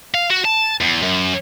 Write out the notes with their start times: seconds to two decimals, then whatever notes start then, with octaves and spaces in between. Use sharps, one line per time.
0.15 F5
0.30 F#4
0.45 A5
0.81 E2
1.02 F#2